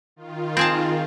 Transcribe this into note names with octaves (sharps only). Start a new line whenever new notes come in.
D#3 F4
C4 G#4 A5